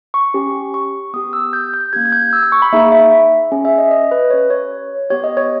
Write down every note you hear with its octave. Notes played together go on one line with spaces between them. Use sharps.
C#6
C#4 G4
C#6
B3 G4 D#6
E6
G6
G6
A#3 C#4 G4 G#6
G#6
G6
E6
E6
C#6
B5
A#3 D#4 G#4 E5
E5
C#4 G#4
E5
D#5
D#5
B4
C#4 G4 C#5
C#5
B3 G4 C#5
D#5
C#5